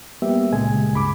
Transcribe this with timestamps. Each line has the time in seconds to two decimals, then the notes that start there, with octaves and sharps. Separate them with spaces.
0.22 G3 A#3 B3 G4 E5
0.53 C#2 A#2 C#3 G#3 G#5
0.93 C#2 G2 B5 D6